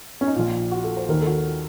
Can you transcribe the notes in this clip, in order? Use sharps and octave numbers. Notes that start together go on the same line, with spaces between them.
C#4
D#4
A#1 A#2 F4
F#4
A4
C5
D#2 D#3 A#4
A4
F#4